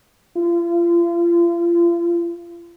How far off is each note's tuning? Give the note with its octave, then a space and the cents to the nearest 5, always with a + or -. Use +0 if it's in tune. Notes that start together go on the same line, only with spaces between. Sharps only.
F4 -35